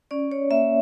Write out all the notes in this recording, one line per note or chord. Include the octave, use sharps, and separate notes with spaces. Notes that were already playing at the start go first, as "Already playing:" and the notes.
C#4 D5
C#4 C#5
A#3 E5